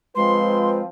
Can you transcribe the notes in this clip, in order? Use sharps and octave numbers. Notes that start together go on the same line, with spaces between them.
F3 G#3 C4 F4 B4 C6